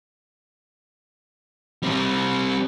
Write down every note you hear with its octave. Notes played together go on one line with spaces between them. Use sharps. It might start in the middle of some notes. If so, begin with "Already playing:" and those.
G3 C4